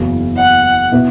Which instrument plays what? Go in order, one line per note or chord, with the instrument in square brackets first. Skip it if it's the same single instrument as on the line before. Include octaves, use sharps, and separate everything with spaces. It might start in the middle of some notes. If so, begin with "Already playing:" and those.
Already playing: [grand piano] F#1 E2 C#3 F#3
[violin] F#5
[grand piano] B2 B3 E4 B4